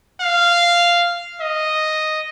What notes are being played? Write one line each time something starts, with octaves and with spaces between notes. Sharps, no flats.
F5
D#5